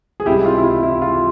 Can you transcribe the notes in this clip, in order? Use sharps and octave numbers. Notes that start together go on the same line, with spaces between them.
G#4
C#2 C3 G3 E4 G4
F4
E4
F4
E4
F4